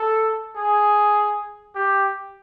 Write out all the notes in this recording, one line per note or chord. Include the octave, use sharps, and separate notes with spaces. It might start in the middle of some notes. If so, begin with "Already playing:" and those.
Already playing: A4
G#4
G4